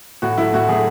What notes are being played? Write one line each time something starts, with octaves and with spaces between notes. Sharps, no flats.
A2 F#4
F#3 A3 E4
A2 F#4
F#3 A3 G#4